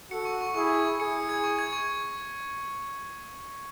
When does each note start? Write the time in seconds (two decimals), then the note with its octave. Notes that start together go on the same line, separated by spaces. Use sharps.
0.11 F#4 A4 C#7
0.25 C#6
0.41 C#6
0.54 E4 G#4 C#6
0.70 G#6
0.84 C#6
0.99 E4 G#4 C#7
1.15 C#7
1.29 G#6
1.44 C#6
1.59 G#6
1.73 C#6